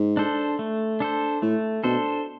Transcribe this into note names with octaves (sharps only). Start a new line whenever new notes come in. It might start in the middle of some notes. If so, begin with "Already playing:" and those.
Already playing: G#2
D4 A4 C5
A3
D4 A4 C5
A2 A3
B2 D4 A4 C5